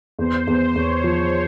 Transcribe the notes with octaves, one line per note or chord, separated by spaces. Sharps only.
E2 C5
E2
E2 C#5
F3